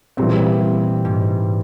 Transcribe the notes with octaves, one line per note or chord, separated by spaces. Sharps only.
A#2 E3 G3 C4
G#2